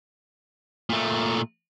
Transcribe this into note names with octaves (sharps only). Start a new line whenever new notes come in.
A#2 A3